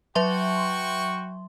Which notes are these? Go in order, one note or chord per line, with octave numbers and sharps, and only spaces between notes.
F#3 F#4 E5 G5 C6 C#6